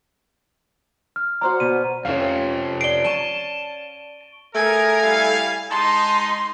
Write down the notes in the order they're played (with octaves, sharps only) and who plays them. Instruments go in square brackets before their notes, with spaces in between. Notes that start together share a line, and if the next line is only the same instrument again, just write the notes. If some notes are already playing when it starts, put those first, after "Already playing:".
[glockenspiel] F6
[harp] F#4 C5 D5 [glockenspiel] A#5
[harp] B2 [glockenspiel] D#7
[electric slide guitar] F2 C3 F3 [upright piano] C#4 F5
[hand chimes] D5 C7 [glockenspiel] D7 G7
[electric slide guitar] A5 [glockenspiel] C#6 D#7 G7
[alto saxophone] A3 [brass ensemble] G#4 A#4 [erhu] G#5
[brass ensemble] G3 E4 F5
[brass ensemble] G#3 D#4 [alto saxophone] A5 [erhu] C6